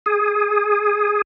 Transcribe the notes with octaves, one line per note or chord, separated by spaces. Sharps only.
G#4